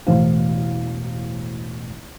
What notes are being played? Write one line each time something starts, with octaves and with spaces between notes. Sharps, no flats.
E1 A1 A3 C5 F5